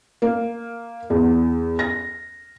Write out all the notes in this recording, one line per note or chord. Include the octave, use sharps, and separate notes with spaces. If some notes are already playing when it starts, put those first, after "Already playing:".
A#3
E2
A#6